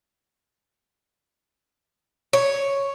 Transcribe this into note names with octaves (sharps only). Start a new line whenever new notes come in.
C#5